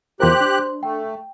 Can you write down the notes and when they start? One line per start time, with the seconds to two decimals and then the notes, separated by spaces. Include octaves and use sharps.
0.20 E2 F4 G4 A#4 C5 C6 F#6
0.41 D4
0.83 A3 G5